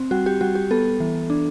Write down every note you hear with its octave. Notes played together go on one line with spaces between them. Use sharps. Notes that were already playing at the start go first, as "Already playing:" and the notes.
Already playing: C4
G3 F#4
G4
G3 F#4
G4
B3 A4
E3
D4